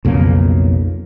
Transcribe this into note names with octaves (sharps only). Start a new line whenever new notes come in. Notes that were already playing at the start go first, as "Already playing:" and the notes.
B1 F2 C#3 A#3